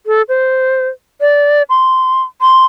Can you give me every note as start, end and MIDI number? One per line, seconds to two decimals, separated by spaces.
0.06 0.22 69
0.28 0.88 72
1.21 1.63 74
1.70 2.22 84
2.41 2.65 84